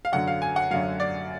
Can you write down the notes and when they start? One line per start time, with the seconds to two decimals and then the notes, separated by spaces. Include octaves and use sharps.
0.05 F5
0.12 F#2 D3 F#3 F#5
0.28 F5
0.42 G#5
0.56 F#5
0.71 F#2 D3 F#3 F5
1.00 D5